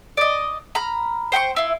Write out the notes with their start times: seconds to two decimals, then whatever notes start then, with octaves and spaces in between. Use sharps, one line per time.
0.17 D5 D#5
0.75 A#5 B5 F6
1.32 C5 G5 B5 C#6
1.56 E4 F4